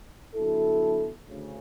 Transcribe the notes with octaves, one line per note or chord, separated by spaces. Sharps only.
D3 F#3 B3 E4 A4
D2 C#3